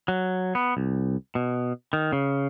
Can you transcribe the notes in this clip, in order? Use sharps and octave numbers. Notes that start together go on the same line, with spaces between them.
F#3
B3
C2
B2
D#3
C#3